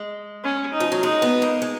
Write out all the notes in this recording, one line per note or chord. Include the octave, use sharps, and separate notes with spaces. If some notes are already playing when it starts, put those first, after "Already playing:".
Already playing: G#3
C#4
D#4
F3
F#3
G#3 D#4
B3
A#3
G#3